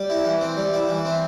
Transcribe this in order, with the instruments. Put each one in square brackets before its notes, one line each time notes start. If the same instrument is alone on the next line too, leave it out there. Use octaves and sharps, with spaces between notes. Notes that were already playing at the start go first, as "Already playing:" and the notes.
Already playing: [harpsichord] G3
E4
E3
C4
G3
E4
E3
C4